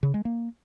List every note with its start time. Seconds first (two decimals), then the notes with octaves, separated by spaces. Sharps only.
0.03 C#3
0.14 G#3
0.25 A#3